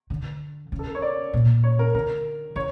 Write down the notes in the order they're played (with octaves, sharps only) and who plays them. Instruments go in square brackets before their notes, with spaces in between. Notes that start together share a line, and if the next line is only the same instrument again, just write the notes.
[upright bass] D3
C#3
[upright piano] A4
A#4
C#5
D5
[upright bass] A#2
[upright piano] C#5
A#4
[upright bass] D3 [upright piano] A#4
[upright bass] E3 [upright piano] C#5